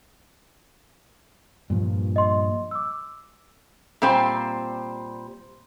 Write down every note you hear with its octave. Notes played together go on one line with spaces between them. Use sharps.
G2 A#2 F3
D#5 C6
D6 E6
A#2 G3 C4 C5